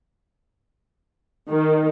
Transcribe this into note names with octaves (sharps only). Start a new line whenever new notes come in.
D#3